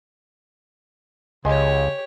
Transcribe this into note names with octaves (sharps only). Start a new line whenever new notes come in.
C#2 C#3 G4 C#5 D#5 G#5 C6